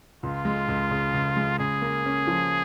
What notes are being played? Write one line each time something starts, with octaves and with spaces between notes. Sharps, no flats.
C#2 F4
G#3
C#2
C#3
C#2
G#3
C#3 G#4
A#3
C#4
F3